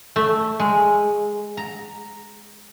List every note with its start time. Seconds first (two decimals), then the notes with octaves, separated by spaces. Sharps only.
0.16 A3
0.59 G#3
1.57 A#5